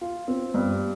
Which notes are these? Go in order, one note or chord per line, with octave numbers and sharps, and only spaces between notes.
F4
C4
G2